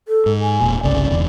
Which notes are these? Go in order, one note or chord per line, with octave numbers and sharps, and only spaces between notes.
A4
G#2
G#5
E1 A#2
G1 C2 C#3 D5
E1 E2 D3